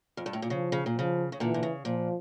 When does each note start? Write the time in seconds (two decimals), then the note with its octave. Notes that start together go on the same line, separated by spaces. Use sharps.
0.17 F2
0.26 G2
0.33 A2
0.42 A#2
0.50 C#3 F3
0.72 C#3
0.86 A#2
0.95 C#3 F3
1.32 C#3
1.40 A#2 D3 E3
1.54 A#2
1.63 C#3
1.85 A#2 F3